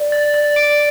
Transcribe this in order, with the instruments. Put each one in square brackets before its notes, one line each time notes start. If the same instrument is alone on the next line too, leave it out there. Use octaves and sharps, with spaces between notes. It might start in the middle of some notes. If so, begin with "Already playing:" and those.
Already playing: [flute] D5
[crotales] A6
A6
D7